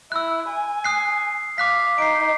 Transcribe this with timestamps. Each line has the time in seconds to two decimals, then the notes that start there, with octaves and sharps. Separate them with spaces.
0.12 E4 E6 F#6
0.50 G#5
0.84 D#6 F#6 C7
1.58 F5 D6 F#6 B6
1.98 D#4 C7 D7